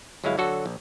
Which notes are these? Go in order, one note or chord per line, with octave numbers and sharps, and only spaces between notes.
G1 F#3 G#3 E4 F5
D3 F#3 F#4 A4
A#1